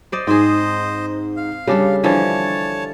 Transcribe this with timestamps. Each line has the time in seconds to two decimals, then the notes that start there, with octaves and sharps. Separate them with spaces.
0.12 C5 D5 D#5
0.27 G#2 C4 G#4 C5 D#5
1.37 F5
1.67 C#3 G3 D4 A4
2.04 D3 E3 F3 C#5 A5